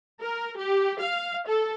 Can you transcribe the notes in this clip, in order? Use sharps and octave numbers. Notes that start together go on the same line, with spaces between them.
A#4
G4
F5
A4